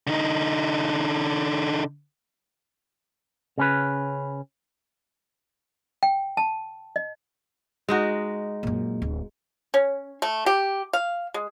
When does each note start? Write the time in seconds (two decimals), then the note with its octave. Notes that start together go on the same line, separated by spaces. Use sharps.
0.07 D3 D#4
3.58 C#3 C#4 B4
6.03 G5
6.37 A5
6.96 D#5
7.89 G#3 D#4 F#4
8.63 F#2 A#2
9.02 D1
9.74 C#4
10.22 A3
10.46 G4
10.93 F5
11.34 G#3